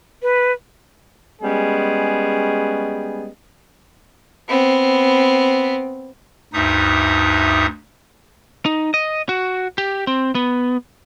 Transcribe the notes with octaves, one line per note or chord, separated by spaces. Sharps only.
B4
G3 G#3 B3 C#4 G#4
B3 C4
D2 G2 D#4 E5 D#6
D#4
D#5
F#4
G4
C4
B3